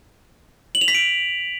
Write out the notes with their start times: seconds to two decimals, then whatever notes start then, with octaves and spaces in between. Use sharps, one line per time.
0.75 F#7
0.81 F7
0.88 B6
0.95 D7